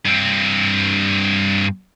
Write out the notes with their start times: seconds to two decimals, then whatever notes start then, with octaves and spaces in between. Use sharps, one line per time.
0.05 G2 C4